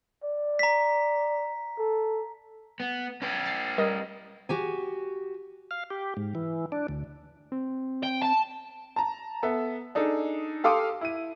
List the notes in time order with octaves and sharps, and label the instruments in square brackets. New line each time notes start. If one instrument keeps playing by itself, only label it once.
[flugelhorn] D5
[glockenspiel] A#5 B6
[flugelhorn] A4
[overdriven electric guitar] B3
C#4 B4
[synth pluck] A6 C7
G3 A#4 D#5
[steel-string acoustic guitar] F#4 G4 G#5
[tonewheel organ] F5
G4
G#2
E3
D4
D2
[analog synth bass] C4
[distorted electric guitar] G5
A5
[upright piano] A5 A#5
B3 A4 E5
D4 D#4 G#4 A4
G4 A4 F5 C6 D6 D#6
E4 D#7